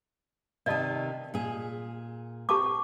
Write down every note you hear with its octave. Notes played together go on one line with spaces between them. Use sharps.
C3 D#3 D5 D#5 A5
A#2 G#4
C4 G4 A5 D6